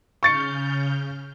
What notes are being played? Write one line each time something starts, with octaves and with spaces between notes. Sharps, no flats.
C#3 C#6 F6 G6 A6 C#7